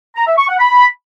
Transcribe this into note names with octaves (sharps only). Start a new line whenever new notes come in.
A#5
E5
C#6
F#5
B5